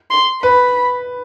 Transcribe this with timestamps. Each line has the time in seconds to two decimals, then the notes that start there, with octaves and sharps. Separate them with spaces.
0.10 C6
0.42 B4 B5